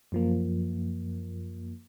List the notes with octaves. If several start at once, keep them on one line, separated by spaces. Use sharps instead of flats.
F#2 F3 A#3